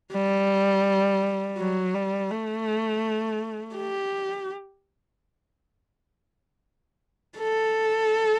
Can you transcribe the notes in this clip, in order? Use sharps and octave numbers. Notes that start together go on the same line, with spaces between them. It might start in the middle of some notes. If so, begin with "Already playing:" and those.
G3
F#3
G3
A3
G4
A4